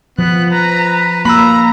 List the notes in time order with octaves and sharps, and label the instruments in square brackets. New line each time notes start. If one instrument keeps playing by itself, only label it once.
[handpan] F3 [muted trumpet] B3 [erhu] F#6
[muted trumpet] B4 [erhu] A#5
[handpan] A#3 [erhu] A#5 [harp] B5 E6